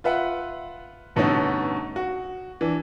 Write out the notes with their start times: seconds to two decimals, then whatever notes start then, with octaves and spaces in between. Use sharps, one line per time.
0.04 F4 B4 E5 F#5
1.16 G2 B2 D3 A3 C#4 D#4
1.96 F#4
2.61 E3 D4